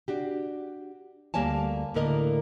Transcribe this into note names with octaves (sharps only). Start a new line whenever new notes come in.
D4 F#4 G4
D2 G3 A#3 C#5 G#5 A5
A2 D3 A#3 A#4 D5 D#5